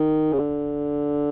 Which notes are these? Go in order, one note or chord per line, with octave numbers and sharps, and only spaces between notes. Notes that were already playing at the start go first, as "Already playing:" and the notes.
Already playing: D#3
C#3
D3